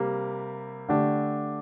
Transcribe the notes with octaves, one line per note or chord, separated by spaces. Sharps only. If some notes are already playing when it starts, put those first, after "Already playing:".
Already playing: C3 G3 A#3
D3 A3 D4 G4